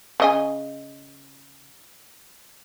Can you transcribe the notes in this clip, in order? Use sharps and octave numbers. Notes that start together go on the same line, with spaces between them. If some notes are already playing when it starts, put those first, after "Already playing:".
C#3 D#5 G#5